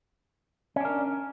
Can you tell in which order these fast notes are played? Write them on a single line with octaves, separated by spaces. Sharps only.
C#4 D4 A#4